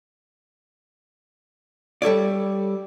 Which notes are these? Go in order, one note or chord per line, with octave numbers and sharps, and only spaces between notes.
G3 A4 C#5 D5